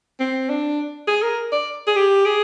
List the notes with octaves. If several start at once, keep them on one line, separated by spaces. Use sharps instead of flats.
C4
D4
G#4
A#4
D5
G#4
G4
G#4